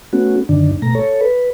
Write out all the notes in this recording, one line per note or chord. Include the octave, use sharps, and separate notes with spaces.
A3 B3 C#4 F#4
F#2 D3 D#3 D4
B2 A3 A#5
A4 C#5
B4